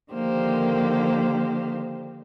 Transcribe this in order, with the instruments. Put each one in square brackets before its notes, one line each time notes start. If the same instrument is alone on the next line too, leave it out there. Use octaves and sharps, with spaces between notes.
[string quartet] D3 D#3 F3 A#3 G4 C5